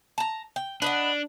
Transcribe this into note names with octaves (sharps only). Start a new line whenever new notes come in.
A5 A#5
G5
D4 B4 D#5 F#5